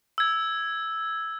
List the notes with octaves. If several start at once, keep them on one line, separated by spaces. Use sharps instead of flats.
E6 G#6